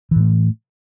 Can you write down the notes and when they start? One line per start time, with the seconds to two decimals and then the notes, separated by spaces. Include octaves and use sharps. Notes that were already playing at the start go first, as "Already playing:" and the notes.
0.11 E3
0.16 A2
0.20 A3